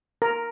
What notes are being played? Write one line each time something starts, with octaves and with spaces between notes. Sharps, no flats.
A#4